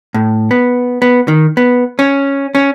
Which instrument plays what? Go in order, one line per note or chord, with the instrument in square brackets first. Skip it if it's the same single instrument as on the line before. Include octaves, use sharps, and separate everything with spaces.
[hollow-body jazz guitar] A2
B3
B3
D#3
B3
C#4
C#4